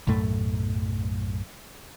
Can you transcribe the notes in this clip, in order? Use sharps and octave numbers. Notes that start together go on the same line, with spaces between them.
B1 F#2 A2 A3